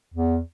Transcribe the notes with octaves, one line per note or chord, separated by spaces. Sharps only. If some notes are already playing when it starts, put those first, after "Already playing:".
E2